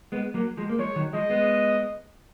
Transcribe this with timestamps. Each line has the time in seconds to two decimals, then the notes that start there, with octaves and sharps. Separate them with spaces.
0.12 G#3 B3
0.34 F#3 A#3
0.57 F3 G#3
0.69 A#3
0.79 F3 G#3 C#5
0.96 D#3 F#3
1.13 F3 G#3 D#5
1.30 G#3 B3